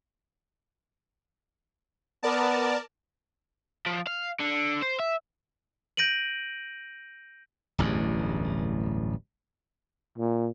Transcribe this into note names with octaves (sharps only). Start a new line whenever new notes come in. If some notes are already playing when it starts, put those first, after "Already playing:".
B3 A#4 D5 A5
F3
F5
D3
C5
E5
G6 A#6 D7 D#7 F#7
D1 A1 E2 G2
A#2